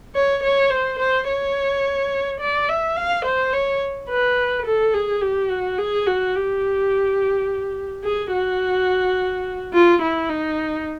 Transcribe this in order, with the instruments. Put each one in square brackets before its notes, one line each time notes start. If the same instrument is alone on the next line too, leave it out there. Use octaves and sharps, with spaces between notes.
[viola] C#5
C#5
C5
C5
C#5
D5
E5
F5
C5
C#5
B4
A4
G#4
G4
F#4
G#4
F#4
G4
G#4
F#4
F4
E4
D#4